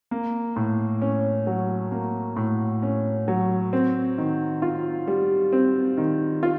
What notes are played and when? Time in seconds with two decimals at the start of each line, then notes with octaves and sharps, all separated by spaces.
0.11 A#3
0.56 A2
1.02 C#4
1.47 F#3
1.92 A#3
2.36 A2
2.83 C#4
3.28 F#3
3.73 C4
4.18 D#3
4.62 F4
5.07 G3
5.53 C4
5.98 D#3
6.43 F4